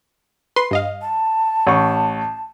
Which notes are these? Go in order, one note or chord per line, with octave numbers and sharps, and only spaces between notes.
B4 C6
G2 D#5 F5
A5
A1 C#6